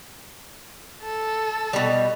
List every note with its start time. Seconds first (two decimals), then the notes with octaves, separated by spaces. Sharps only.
1.04 A4
1.73 B2 G3